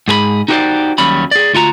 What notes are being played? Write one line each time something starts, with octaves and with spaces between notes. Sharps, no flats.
G#2 G#4 B4 B5
D#4 F#4 G4 A4 C5 D5
D#2 F#3 G3 C#4 C#5 B5
G#4 D5
D2 F4 F#4 A#5